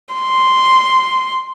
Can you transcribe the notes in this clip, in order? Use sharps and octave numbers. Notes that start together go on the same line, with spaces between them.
C6